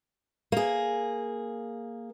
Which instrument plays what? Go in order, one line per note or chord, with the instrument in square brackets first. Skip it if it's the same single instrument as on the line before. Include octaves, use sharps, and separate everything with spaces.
[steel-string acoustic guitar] A#3 G#4